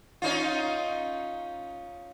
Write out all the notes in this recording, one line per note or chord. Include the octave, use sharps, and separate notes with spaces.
C#4 D#4 F4